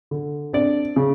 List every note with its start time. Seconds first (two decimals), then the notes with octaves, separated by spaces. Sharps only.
0.11 D3
0.53 C4 D4 D5
0.96 C#3